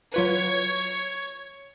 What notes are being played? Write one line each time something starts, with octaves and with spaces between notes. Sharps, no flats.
F#3 F4 B4 C#5 G#6